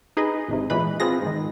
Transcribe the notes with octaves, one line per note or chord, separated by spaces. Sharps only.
D#4 G#4 B4 D#5
G#1 G#2 C3
A#2 E3 G#3 B4 B5
B3 C4 F4 G#4 A#6
G#2 D#3